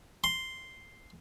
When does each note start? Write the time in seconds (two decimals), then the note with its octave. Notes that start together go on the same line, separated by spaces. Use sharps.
0.24 C6